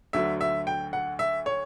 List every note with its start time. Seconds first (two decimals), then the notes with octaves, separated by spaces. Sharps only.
0.13 D2 D3 F#3 E5
0.41 E5
0.67 G5
0.93 F#5
1.19 E5
1.46 C#5